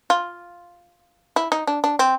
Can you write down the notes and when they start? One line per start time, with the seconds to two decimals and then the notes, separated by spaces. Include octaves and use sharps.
0.10 F4
1.36 E4
1.52 D#4
1.67 D4
1.84 D4
1.99 C4